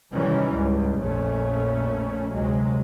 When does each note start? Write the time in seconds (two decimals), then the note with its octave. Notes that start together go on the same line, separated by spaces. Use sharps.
0.13 C3 D#3 E3 F#3 G3 C#4
0.49 C#2 G#2 G3
0.98 A#1 F2 A#2 A3 C#4
2.32 D2 C3 F#3 G#3